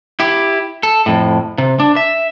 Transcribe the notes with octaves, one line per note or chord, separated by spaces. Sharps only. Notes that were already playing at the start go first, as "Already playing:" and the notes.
E4 G4
A4
F2 A2
C3
D4
E5